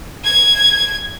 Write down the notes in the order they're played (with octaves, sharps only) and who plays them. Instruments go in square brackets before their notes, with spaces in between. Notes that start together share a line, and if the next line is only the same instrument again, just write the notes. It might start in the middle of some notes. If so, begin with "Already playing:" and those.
[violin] G#6